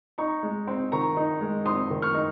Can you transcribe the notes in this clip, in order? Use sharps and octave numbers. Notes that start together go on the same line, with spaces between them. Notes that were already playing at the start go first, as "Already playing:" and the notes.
D#4 A#5 C#6
G#3
C4
D#3 A#5 C#6
D#4
G#3
C4 C6 D#6
D#3
C#6 F6
D#4